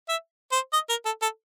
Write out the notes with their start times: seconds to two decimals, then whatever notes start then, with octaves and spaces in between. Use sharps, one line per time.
0.09 E5
0.52 C5
0.73 D#5
0.89 A#4
1.05 A4
1.22 A4